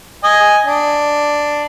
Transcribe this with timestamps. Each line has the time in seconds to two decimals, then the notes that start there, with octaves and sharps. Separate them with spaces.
0.24 D#5 G#5
0.66 D4